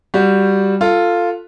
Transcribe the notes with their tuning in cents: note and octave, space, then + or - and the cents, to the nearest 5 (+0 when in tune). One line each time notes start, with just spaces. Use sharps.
G3 +0 F#4 -10
F4 +0 A4 +15